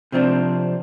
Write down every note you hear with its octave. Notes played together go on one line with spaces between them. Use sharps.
C3 F3 C4 D4